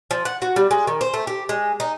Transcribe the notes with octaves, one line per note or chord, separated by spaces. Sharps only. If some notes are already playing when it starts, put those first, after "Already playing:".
F3
F#5
F#4
G3
G#3
D#3
C5
A3
G4
G#3
D#4